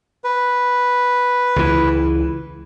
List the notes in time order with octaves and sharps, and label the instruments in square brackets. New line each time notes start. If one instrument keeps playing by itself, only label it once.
[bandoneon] B4
[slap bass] C#2 E3